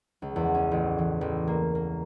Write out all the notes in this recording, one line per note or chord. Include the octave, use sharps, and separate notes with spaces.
C#2
E2
C#4
A1
E3
A1
A#3
A#3